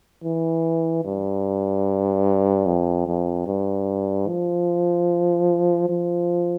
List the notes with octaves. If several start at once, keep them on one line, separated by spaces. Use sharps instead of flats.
E3
G2
F2
F2
G2
F3
F3